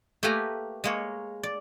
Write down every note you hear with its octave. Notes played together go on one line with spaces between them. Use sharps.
A3 A#3 G4 B4 G#5 A#5
G#3 A#3 C#5
D5